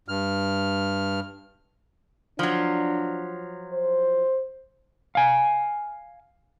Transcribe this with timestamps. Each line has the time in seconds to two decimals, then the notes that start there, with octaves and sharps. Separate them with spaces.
0.08 G2 F6
2.39 F3 F#3 D4
3.73 C5
5.15 F5 G#5